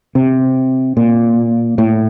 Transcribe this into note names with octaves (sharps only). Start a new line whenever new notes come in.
C3
A#2
A2